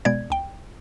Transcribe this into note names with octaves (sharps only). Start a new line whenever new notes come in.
B2 G#3 B3 D5 G#6
C#2 G5